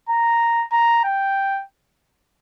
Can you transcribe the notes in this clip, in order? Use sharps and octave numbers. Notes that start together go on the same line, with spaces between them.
A#5
A#5
G5